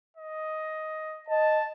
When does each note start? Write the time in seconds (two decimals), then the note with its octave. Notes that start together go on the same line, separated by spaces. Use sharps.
0.17 D#5
1.29 D#5 A5